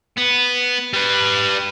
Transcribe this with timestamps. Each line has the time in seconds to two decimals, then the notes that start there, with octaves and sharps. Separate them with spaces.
0.18 B3
0.94 G3 B4